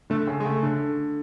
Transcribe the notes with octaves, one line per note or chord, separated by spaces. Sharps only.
D3 A3
C#3
G#3
C#3 A3
D3